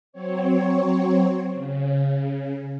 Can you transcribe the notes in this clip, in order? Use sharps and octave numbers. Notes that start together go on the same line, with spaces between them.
F#3 C4 C#5
C#3